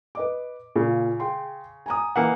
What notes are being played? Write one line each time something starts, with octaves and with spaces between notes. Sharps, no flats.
B4 D#5 D6
A#2 C#3
G#4 G5 C6
G#5 A#5 D#6
E3 A#3 F#5